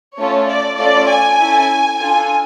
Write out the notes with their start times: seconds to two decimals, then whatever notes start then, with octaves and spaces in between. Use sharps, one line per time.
0.17 A3 C#4 F4 A4 C#5
0.49 D5
0.78 A3 C#4 F4 A4 D5
1.08 G#5
1.40 C#4 E4 A4
1.99 D4 F4 A4 G#5